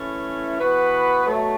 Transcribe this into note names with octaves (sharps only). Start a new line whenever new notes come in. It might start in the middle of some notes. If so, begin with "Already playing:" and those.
Already playing: E3 A3 C#4 E4
E3 B3 F#4 B4
B2 F#3 A3